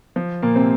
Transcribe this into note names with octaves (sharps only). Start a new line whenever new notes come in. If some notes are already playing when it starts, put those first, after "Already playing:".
F3
A#2 A#3
C3 C4